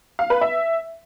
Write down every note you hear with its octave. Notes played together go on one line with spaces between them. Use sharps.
F5
B4
E5